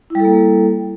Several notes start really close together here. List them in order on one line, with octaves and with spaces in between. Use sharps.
E4 G3 A4 A#3